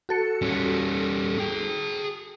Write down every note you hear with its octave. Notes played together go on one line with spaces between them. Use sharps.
F#4 A4 C#7
G3 C#4
G#4 G5